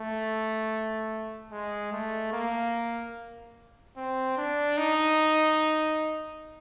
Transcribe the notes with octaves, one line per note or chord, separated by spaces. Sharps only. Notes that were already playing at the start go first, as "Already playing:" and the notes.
Already playing: A3
G#3
A3
A#3
C4
D4
D#4